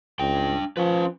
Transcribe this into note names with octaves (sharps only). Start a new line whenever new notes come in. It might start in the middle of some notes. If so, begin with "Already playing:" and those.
C#2 D4 G5
F3 C#4 B4